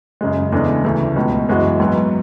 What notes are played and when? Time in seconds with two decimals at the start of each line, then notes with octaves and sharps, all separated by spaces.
0.21 F#2 C#3 G#3
0.52 E2 C#3 G#3 D4 A4
0.84 D2 C#3 E3 A3
1.16 C#2 B2 G#3
1.48 F#2 E3 G#3 B3 F#4
1.80 G#2 F#3 B3